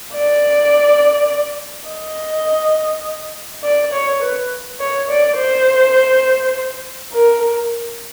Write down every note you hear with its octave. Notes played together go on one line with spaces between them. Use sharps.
D5
D#5
D5
C#5
B4
C#5
D5
C5
A#4